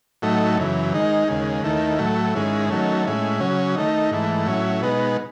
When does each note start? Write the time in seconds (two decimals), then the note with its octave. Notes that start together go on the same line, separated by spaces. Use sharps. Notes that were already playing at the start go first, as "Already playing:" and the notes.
0.22 A2 F#3 A3 D#4
0.58 F#2 C#3 E3
0.94 D#3 G#3 D#4
1.28 D#2 C#3 G#3
1.64 D#2 D#3 A3 E4
1.99 A2 F#3 A3
2.34 G#2 D#3 G#3 C#4 E4
2.69 D#3 F#3 A3 C#4
3.05 A2 G#3 C#4 E4
3.40 C#3 F#3 C#4
3.76 D#3 A3 D#4
4.11 G#2 E3 A3
4.46 A2 F#3 C#4 E4
4.81 B2 G#3 B3 D#4